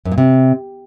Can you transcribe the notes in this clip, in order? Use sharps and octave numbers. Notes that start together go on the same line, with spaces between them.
F#2
A#2
C3